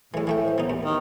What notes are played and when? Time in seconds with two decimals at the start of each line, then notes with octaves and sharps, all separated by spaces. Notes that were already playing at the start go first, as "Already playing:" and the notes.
0.14 A2 E3 G#3 A4
0.27 E3 A3 E5 G5
0.44 C5
0.58 E3 B3 D#4
0.70 D#2
0.85 D#3